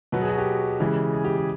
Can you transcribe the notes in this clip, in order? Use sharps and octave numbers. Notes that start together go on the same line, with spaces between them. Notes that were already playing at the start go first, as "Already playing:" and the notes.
B2 F#3 B3
G#4
F#4
G4
C#3 E3 G#3
G#4
G4
G#4